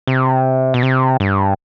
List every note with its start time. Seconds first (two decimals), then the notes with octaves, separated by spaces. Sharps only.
0.07 C3
0.74 B2
0.83 C3
1.20 G2